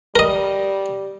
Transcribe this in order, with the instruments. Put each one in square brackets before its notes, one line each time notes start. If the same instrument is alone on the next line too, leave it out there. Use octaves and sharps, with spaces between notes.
[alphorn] G3 [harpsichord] A#4 D#5